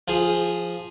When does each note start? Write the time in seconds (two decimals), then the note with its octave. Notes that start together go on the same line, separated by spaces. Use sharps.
0.08 F3 G#4